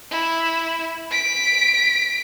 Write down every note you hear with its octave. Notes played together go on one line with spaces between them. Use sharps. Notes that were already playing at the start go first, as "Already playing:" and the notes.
E4
B6 D7